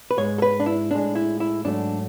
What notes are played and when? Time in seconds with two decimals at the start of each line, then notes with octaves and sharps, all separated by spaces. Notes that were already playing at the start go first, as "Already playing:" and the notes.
0.11 B4
0.18 G#2 G#3 C#5
0.38 A4
0.42 B4
0.60 D4
0.66 E4
0.91 A2 G#3 D4
1.15 E4
1.40 E4
1.65 G#2 F#3 A3 D4